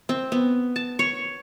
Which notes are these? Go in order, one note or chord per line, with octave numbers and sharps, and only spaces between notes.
C4
B3
A5
C#5